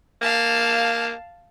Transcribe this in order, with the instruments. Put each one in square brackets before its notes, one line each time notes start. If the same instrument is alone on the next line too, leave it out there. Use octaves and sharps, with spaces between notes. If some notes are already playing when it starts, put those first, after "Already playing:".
[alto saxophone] A#3 [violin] F5 A5